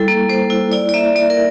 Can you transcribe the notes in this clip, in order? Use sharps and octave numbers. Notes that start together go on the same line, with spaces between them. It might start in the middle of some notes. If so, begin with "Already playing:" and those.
Already playing: G3 E4 A4
A#3
A#3 C5
E4
E4 D5
D5
A#3 E5
A#3 D5
A#4